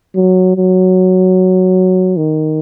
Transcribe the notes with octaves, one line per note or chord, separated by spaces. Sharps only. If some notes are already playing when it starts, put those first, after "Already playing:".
F#3
F#3
D#3